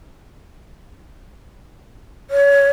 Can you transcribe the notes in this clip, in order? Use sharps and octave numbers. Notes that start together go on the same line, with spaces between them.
C#5